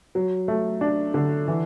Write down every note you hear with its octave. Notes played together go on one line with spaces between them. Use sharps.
F#3
A3
D4
D3
E3